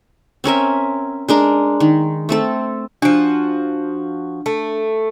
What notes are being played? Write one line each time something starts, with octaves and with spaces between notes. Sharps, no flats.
C4 C#4 A#4 E5
G#3 D4 A#4
D#3
A3 C4 A4
F3 D4 F#4
A3